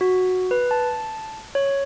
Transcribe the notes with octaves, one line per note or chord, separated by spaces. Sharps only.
F#4
B4
A5
C#5